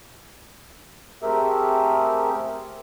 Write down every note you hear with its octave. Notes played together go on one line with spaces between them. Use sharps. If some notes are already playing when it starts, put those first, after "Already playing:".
A3 C4 G4 G#4 A#4 E5